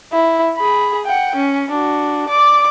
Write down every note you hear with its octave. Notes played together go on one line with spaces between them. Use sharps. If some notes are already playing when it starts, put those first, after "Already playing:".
E4
G#4 B5
F#5 G5
C#4
D4 F#4
D5 D6